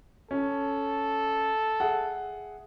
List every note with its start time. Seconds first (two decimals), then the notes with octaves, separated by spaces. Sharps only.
0.31 C#4 A4
1.80 G#4 E5 F#5